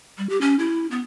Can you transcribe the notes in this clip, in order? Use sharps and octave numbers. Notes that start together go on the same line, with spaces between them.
G3
G4
C#4
E4
B3